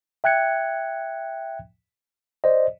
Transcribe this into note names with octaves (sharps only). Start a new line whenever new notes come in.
E5 G5 F#6 G#6 C#7
C5 D5 D#5